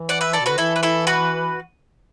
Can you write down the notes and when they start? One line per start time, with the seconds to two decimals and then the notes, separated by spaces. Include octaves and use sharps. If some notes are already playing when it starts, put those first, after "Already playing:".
Already playing: E3
0.09 D5 F#5
0.21 B4 E5
0.33 A4 D5
0.40 B2
0.46 D3 F#4 B4
0.58 E3 E4 A4
0.76 B4
0.83 E4 A4
1.07 F#4 B4